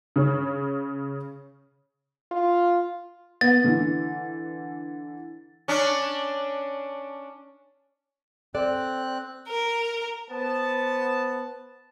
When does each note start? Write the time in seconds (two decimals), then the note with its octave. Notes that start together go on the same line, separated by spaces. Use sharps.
0.16 C#3 C#4
2.31 F4
3.41 B3 A6
3.64 D3 E3
5.68 C#4 D4
8.54 C4 A4 D5 F#6
9.48 A#4
10.30 B3 C5 A5